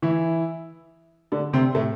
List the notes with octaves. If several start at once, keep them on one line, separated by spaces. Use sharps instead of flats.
E3 E4
D3 D4
C3 C4
A2 A3